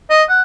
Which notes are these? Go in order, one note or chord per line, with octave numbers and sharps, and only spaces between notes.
D#5
F#5